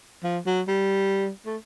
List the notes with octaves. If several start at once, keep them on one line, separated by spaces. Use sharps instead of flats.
F3
F#3
G3
A3